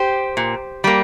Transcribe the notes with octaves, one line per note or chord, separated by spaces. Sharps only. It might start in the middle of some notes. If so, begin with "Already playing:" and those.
Already playing: G4 C5
A#2
G3 A#3